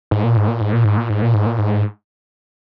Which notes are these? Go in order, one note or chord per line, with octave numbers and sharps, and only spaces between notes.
G#2
A#2
G#2
A#2
G#2
A#2
G#2
A#2
G#2
A#2
G#2
A#2
G#2